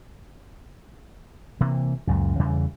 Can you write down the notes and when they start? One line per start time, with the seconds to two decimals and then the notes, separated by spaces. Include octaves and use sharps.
1.61 C3 E3 A#3
2.07 C#2 F#2 A#2
2.39 E2 C#3 E3 G3